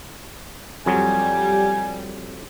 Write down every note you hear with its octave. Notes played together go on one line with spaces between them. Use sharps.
F2 F#3 G3 G#5